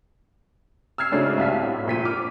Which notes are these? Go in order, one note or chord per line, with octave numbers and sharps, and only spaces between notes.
E6 F6 G#6 C7
G#2 C#3 A3 C#4 D4 F#4
C2 E5 F5 B6
A2
A#1 A#2 B6 D#7
D6 F6